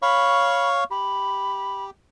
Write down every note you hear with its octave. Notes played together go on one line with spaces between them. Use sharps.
C#5 F5 B5 C#6
G4 B5